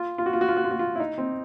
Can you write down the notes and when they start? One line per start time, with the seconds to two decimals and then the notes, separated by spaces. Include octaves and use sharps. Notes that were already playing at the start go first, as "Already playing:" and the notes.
Already playing: F4
0.18 F4
0.26 F#4
0.33 F4
0.41 F#4
0.48 F4
0.56 F#4
0.64 F4
0.71 F#4
0.79 F4
0.95 E4
1.00 D#4
1.18 C4